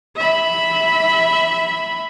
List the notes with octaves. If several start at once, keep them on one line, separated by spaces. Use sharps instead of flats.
E5 B5